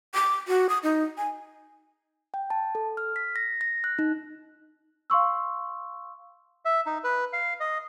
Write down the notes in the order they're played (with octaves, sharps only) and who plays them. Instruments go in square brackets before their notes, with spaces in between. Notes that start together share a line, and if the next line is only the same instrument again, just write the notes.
[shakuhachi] D6
F#4
D#6
D#4
G#5
[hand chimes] G5
A5
A4
F6
B6
A#6
A#6
F#6
D#4
[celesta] F5 C6 C#6 E6
[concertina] E5
D#4
B4
F5
D#5